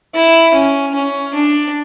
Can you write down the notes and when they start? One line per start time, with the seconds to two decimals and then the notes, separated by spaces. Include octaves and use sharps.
0.15 E4
0.54 C#4
0.94 C#4
1.34 D4